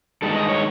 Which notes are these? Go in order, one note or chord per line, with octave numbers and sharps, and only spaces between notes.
G2 D#3 G#3 A4
D#5
C#5